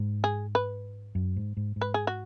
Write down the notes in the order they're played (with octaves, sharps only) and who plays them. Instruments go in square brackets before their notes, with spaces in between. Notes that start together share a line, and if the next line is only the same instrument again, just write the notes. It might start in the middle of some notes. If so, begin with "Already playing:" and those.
Already playing: [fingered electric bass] G#2
[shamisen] G#4
B4
[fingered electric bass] F#2
G#2
G#2
G#2
[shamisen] B4
G#4
F#4